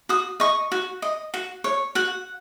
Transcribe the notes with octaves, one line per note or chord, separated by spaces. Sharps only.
F#4 D#6
D#5 C#6
F#4
D#5
F#4
C#5
F#4 F#5